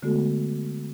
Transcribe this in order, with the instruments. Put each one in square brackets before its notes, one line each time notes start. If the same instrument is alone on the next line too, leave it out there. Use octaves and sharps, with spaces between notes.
[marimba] D3 G#3 A3 B3 F#4 A4